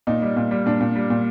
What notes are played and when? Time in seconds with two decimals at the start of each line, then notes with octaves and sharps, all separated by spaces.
0.07 A#2 D#4
0.22 G3
0.36 A#2
0.51 G3
0.66 A#2 D4
0.81 A#2
0.96 G3
1.10 A#2